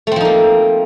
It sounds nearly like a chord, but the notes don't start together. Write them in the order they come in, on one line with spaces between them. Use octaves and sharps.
A3 C4 F3 D#4 A#3